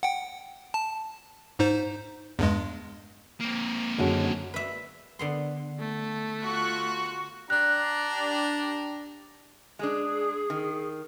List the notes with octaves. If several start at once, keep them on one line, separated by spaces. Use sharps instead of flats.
F#5 G5
A5
G#2 D#4 C5
E2 G2 G#3
A#3 C4
F#2 D3 D#3 G#3 C#4 F#4
B4 E5
D3 B3 C6
A3
F4 F#4 C#6 F#6
D4 G4 A#5 F#6
G#3 D4 G#4
D#3